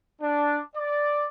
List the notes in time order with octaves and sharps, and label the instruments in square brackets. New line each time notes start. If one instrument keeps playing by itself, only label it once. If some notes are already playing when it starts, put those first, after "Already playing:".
[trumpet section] D4
D5